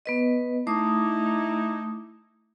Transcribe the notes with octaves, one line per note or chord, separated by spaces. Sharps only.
B3 B4 D#5
A3 D#4 E4 D6 D#6